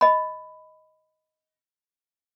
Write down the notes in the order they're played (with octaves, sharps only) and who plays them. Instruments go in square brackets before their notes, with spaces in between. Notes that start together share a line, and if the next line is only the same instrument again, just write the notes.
[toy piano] D#5 B5